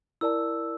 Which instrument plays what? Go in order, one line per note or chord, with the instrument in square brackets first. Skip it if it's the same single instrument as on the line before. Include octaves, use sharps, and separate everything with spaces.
[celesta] E4 A#4 D5 A5 [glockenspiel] E6